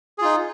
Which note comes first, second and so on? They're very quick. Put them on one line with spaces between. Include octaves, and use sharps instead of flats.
G#4 F4 D#4